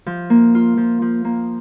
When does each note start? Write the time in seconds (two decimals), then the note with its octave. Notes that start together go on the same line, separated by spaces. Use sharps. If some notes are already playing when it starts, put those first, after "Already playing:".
0.06 F3
0.30 A#3
0.55 F4
0.77 F3
1.02 F3
1.25 A#3